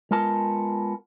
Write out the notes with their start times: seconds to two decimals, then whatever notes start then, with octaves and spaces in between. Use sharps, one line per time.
0.11 G#3 B3 F4 A#4 A5